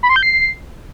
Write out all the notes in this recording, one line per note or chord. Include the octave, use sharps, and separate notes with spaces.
B5
C6
G6
C7